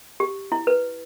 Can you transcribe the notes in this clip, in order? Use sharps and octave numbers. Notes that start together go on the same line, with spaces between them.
G4
E4
B4